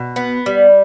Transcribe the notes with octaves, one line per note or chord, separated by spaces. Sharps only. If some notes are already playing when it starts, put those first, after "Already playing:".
Already playing: B2
B3
G3